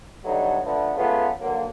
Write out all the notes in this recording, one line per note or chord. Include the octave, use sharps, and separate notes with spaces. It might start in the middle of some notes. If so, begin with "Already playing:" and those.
D3 F#3 G3 A3 B3 D#4
D3 F3 A3 B3
G#3 A3 B3 C#4 F4
B1 D3 F#3 A#3